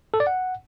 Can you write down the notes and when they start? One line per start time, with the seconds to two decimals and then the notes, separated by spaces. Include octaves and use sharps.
0.14 A4
0.20 D5
0.27 F#5